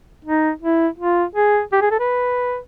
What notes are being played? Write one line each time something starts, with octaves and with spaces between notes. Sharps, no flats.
D#4
E4
F4
G#4
G4
G#4
A4
B4